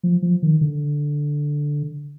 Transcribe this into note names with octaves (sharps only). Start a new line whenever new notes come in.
F3
F3
D#3
D3